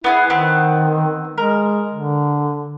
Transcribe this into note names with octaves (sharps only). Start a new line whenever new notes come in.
B3 E4 F4 G#4
D#3 B3 C4
G#3 A#4
D3